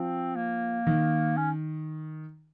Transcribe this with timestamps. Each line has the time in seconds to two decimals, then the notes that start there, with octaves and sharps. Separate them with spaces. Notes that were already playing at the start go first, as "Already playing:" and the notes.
Already playing: F3 C4
0.36 A#3
0.87 D#3
1.37 C#4